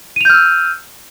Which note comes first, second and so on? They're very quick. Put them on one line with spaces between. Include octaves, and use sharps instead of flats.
D#7 F7 G6 F6 E6